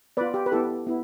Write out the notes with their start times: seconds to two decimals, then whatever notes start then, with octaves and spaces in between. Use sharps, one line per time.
0.17 B3 F4 B4 D5
0.34 G4
0.46 B4
0.52 B3 E4 G4 A4
0.87 B3 E4